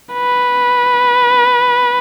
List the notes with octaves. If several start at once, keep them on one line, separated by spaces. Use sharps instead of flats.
B4